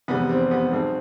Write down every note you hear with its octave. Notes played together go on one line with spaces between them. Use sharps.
F1 E2 C3 G#3 B3
C4
B3
B1 B2 G#3 C4